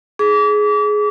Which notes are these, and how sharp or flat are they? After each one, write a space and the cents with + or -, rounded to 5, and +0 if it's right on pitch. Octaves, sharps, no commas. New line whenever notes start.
G#4 +15 D6 -35